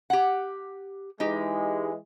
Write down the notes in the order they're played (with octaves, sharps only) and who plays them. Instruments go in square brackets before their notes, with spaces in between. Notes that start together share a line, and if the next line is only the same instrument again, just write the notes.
[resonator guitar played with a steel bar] G4 F#5
[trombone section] E3 G#3 [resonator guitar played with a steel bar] D#4 G4